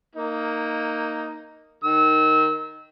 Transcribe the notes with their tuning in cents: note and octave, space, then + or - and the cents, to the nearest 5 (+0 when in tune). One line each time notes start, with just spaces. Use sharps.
A#3 -10 D#4 +0
D#3 +0 E6 -30